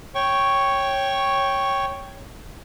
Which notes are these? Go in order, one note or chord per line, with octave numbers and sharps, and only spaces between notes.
C#5 G5 C#6